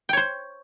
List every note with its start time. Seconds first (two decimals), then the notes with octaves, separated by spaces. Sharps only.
0.09 G5
0.13 C#5
0.17 C5